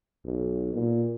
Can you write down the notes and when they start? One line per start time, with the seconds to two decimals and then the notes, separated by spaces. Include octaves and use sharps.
0.25 B1
0.74 A#2